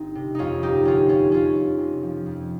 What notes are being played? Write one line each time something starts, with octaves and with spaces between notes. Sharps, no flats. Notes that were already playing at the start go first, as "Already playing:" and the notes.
Already playing: G1 C4 D#4
C3
F2 C#4 D#4 F4
G1 D#4 G4
G1 C#4 F4
F2 C#4 F4
F2 C#4 F4
F2
C3
F3
F2